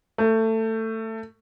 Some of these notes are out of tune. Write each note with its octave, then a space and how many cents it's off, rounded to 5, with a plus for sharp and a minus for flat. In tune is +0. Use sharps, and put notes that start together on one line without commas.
A3 +20